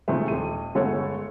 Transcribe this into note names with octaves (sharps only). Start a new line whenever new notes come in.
A2 C3 D#3 F3 G#3 A3
D#1 D#7
G1 G#3 A3 B3 A4 C#5